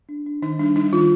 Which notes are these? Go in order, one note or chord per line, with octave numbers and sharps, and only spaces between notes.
D4
D4
D#3 D#4
G3 D4
G3 D#4
D#3 F4